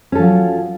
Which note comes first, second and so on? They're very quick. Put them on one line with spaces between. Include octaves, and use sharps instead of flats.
C#4 A4 F3 F#3